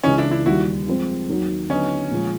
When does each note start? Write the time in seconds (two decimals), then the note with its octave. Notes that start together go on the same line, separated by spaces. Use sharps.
0.03 C#2 C#3 E3 C#4 D#4
0.18 D4 E4
0.31 D4 E4
0.46 D#2 D#3 G3 E4 F#4
0.87 F3 G#3 C4
1.28 D#2 D#3 F#3
1.69 D3 F#3 B3 C#4 D#4
2.11 A#2 F3 G#3